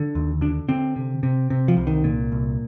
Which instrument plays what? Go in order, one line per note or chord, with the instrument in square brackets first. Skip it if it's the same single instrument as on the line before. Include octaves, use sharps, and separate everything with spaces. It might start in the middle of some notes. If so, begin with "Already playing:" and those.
Already playing: [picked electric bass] D3
D#2
D3 D4
D3 C4
C3
C3
C3
F3
C2
D#3
A#2
C2